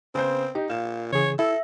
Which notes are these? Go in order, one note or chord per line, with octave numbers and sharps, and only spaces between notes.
C#3 B3 C4 C5
D#4 G4
A#2 F5 E7
C#3 E3 G#4 C#5
E4 A4 E5